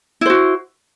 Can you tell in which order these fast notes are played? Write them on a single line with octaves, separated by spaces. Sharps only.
E4 C5 F#4